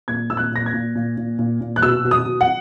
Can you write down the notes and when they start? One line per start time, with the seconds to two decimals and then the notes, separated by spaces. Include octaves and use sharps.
0.08 A#2 G#6
0.30 A#2 E6
0.37 F#6
0.52 A#2 A#6
0.66 G#6
0.74 A#2
0.95 A#2
1.17 A#2
1.39 A#2
1.61 A#2
1.76 F#6
1.82 B2 E6
2.04 B2
2.11 D#6
2.26 B2
2.41 F#5